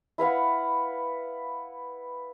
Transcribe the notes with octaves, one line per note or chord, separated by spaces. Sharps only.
E4 B4 F5 F#5